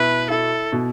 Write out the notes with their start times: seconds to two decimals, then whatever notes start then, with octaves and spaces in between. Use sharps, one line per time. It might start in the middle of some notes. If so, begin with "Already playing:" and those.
Already playing: B2 E4 B4
0.30 E4 A4
0.72 B2